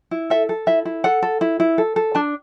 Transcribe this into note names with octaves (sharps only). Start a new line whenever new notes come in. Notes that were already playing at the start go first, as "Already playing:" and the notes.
E4
A4 E5
A4
E4 E5
E4
A4 F#5
A4
E4
E4
A4
A4
D4 A5